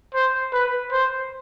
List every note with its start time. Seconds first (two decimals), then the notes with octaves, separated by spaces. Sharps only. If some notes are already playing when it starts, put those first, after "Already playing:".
0.15 C5
0.53 B4
0.92 C5